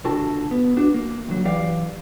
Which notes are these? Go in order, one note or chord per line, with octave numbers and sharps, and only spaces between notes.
C#2 A#2 D3 F#4 A4 A5
B3
D4 F#4
A#3
D2 F#3
F#2 E3 G4 D5 F5